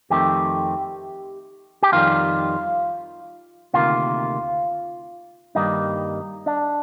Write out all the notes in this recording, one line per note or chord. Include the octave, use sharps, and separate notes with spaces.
F2 D#3 A3 C4 G4
G4
F2 D#3 G3 F4
D2 C3 D#3 A#3 F4
G2 D#3 G3 A#3 D#4
D4